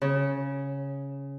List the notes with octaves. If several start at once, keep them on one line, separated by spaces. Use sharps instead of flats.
C#3